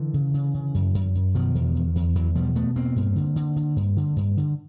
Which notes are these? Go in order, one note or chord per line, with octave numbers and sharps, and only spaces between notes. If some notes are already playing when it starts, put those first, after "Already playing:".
Already playing: D3 E3
C#3
C#3
C#3
F#2
F#2
F#2
B2 D#3 F3
E2
E2
E2
E2 E3 F#3
B2 F3 G3
B2 A3 B3
E2 A#3 C4
G2
D3
D3
D3
G2
D3
G2
D3